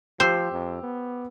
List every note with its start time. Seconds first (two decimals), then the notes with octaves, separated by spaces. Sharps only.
0.20 F3 G4 C5 E6
0.52 F2
0.83 B3